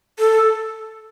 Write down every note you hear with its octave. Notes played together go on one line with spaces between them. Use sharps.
A4